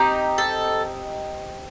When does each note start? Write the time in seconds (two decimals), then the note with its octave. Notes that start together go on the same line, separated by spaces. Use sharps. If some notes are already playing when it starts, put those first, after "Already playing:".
Already playing: C4 D#4 G4
0.38 A4